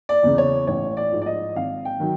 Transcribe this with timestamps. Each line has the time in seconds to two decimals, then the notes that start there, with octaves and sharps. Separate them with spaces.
0.09 D5
0.23 E2 C#3
0.38 C#5
0.67 A1 C#5
0.97 D5
1.12 G#2 F3
1.22 D5
1.26 D#5
1.55 G#1 F5
1.85 G5
2.00 D#3 F#3